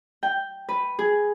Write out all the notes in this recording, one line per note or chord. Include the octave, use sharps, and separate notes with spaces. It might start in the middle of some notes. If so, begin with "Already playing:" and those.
G5
B4
G#4